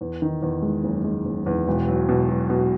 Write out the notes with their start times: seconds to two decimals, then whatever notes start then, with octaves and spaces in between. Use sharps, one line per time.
0.01 E2
0.22 D#3
0.42 E2
0.62 G#3
0.84 F#1
1.04 G#3
1.25 F#1
1.46 E2
1.67 E1
1.88 F#3
2.09 B2
2.29 F#3
2.50 B2